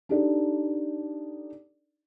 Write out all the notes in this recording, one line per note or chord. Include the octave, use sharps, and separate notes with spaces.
D4 D#4 G4 A4 D5